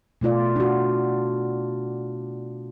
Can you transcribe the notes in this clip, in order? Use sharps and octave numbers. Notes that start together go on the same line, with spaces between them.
B2 A3 F4 D5
D4 F#4